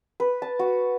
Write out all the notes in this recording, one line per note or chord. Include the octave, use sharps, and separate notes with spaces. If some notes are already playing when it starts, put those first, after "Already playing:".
B4
A5
F#4